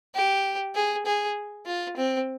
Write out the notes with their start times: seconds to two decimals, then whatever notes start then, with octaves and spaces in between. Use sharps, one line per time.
0.15 G4
0.75 G#4
1.06 G#4
1.66 F4
1.97 C4